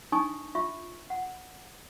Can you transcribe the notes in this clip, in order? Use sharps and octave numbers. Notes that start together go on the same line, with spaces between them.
D4 D#4 G#5 A5 C#6 D#6
F4 E5 C#6
F#5